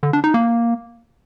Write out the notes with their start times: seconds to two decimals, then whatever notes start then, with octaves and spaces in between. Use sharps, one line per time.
0.03 D3
0.13 D4
0.24 D#4
0.34 A#3